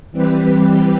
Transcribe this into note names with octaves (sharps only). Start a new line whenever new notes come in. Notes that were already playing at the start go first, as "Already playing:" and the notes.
E3 G3 C4 G4 B4